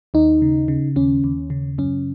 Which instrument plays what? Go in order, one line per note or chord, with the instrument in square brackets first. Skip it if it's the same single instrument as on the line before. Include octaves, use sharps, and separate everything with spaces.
[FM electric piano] D#2 D#4
C#3
C#3
D#2 C#4
D#2
C#3
F#2 C#4